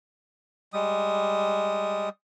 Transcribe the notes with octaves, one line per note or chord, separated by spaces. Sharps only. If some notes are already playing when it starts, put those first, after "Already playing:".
G3 G#3 D#6